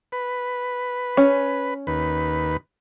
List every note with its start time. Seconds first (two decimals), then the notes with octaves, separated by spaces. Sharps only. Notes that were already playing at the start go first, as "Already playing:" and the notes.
0.12 B4
1.17 C#4
1.87 D#2 B4